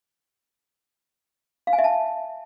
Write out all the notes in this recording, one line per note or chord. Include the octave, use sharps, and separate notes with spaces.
F5
G#5
E5
A5